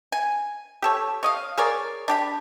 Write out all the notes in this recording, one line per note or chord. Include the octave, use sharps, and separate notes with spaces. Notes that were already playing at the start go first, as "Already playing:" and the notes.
G#5
G4 A4 C#5
C#5 D#5 F5
G#4 A#4 C#5 D5
D4 G4 B5